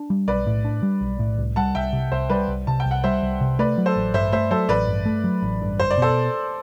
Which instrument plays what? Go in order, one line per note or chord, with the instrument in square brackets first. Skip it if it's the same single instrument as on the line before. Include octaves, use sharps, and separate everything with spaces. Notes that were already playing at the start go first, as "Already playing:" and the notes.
Already playing: [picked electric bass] D4
G3
[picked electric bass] B1 [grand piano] B4 D5
[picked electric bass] A2
D4
G3
B1
A2
C2
[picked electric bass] G3 [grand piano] F#5 A5
[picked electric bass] C2 [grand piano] E5 G5
[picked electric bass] C3
[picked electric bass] C2 [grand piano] C5 E5
[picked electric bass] G3 [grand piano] B4 D5
[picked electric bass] C2
[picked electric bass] C3 [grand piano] A5
[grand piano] G5
[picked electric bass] C2
[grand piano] F#5
[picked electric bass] G3 [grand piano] C5 E5
[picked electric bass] C2
C3
[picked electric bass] A3 [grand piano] B4 D5
[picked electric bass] F#3
[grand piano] A4 C5
[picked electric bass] A1
[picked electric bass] G2 [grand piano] C5 E5
[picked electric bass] A3 [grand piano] C5 E5
[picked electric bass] F#3 [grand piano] A4 C5
[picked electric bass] A1 [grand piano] B4 D5
[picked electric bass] G2
A3
F#3
A1
G2
[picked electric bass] F#1 [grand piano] C5
[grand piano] D5
[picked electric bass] B2 [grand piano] A4 C5